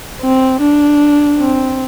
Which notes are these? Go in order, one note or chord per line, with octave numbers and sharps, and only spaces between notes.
C4
D4
C4